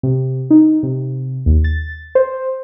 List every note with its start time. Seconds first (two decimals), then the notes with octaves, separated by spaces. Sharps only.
0.03 C3
0.50 D#4
0.83 C3
1.46 D#2
1.64 A6
2.15 C5